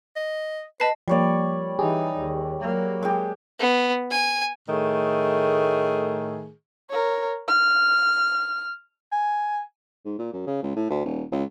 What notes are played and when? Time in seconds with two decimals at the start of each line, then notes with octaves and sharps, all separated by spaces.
0.16 D#5
0.80 B4 D#5 A5 C7
1.08 F3 G3 A#3 C#5 D5
1.79 E3 D#4 G4 G#4
2.18 D#2
2.61 F#3 A#3
3.03 G#3 G4
3.59 B3
4.11 G#5
4.69 A2 D#3 A3 G#4
6.90 A#4 C#5
7.48 F6
9.12 G#5
10.05 G#2
10.19 A#2
10.33 F#2
10.47 C#3
10.63 C#2
10.76 A2
10.90 D2
11.05 D#1
11.32 C#2